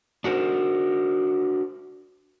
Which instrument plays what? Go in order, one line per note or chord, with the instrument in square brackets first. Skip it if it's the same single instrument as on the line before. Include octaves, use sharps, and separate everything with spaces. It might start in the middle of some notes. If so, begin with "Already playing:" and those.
[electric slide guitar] D4 F#4 A#4 C5